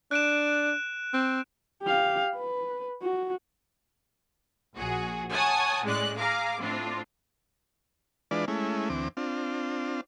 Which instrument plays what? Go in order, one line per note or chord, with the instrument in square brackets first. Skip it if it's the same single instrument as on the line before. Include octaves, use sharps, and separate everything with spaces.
[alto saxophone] D4 [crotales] F#6 D7 E7
[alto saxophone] C4
[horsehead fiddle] G4 F5
B4
F#4
[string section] A#1 F#4 G#4
C#5 F#5 G#5 A5 D#6
A2 G#3 C#4 D5 F#6
G#4 F5 A#5 D6
A2 C4 D4 F4
[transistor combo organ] E3 G#3 D4 F4 B4 D5
G#3 A3 C#4 E4
D2 E3 C4 D6
C4 D4 F4